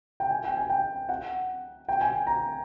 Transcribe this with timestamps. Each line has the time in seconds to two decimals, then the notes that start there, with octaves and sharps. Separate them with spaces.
0.20 G5
0.30 G#5
0.44 G5
0.57 G#5
0.70 G5
1.09 F#5
1.89 G5
2.01 G#5
2.27 A#5